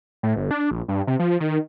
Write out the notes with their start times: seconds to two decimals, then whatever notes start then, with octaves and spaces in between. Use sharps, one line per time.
0.23 A2
0.37 G1
0.51 D4
0.71 A#1
0.88 G2
1.07 C3
1.19 F3
1.40 D#3